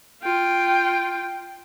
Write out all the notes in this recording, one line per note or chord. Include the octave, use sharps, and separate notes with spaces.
F4 G5